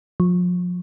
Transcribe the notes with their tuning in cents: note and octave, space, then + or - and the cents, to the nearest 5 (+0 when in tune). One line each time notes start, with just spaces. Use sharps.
F3 +35